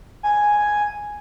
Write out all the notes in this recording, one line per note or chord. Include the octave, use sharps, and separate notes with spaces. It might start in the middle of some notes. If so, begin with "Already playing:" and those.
G#5